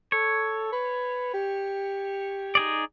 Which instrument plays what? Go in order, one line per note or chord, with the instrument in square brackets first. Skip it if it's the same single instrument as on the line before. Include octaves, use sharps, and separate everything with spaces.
[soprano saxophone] A4 [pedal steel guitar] C#5
[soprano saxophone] B4
G4
[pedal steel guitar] D#4 G#4 D5